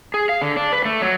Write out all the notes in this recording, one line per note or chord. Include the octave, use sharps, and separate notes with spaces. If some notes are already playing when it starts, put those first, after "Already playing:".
G#4
F5
D3
D4
B4
A3
F#3